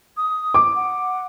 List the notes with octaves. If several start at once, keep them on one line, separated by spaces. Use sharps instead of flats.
D#6
D6
F#5